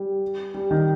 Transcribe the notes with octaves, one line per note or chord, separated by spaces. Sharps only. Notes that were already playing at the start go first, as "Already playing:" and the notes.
Already playing: G3
G3
D#3